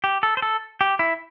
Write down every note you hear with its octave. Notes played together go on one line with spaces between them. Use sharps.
G4
A4
C5
A4
G4
E4